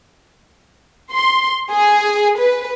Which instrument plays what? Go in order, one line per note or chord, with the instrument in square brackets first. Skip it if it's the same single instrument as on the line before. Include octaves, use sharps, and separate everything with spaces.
[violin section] C6
G#4
B4